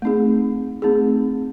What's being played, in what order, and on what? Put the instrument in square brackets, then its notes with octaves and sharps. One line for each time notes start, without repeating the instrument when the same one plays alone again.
[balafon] A3 C4 D#4 G#4
A3 C4 D#4 G#4